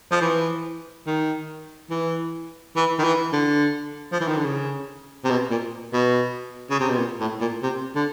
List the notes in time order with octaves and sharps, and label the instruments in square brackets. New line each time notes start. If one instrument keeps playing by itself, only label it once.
[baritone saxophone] F3
E3
D#3
E3
E3
D#3
E3
D3
F3
E3
D#3
D3
C#3
C3
B2
A#2
B2
C#3
C3
B2
A#2
A2
A#2
C3
D3